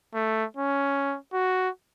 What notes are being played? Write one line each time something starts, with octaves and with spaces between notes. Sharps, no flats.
A3
C#4
F#4